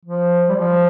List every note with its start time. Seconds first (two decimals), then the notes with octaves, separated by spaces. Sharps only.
0.05 F3
0.49 G3
0.56 F3